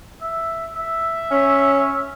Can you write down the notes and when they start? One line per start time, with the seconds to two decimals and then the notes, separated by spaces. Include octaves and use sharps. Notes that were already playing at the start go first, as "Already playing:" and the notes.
0.22 E5
0.76 E5
1.31 C#4